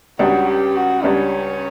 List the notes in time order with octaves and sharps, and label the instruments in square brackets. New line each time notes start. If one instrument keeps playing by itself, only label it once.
[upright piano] C#2 C#3 G3 D4 [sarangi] F#4
[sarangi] G4
F#4
[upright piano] C#2 C#3 G3 D4 [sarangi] C#4